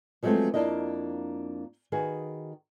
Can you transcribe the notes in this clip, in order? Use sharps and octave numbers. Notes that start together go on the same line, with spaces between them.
F3 F#3 G#3 A3 B3 C4
F2 C#3 A#3 D4 E4 D#5
D#3 F#4 G#4 B4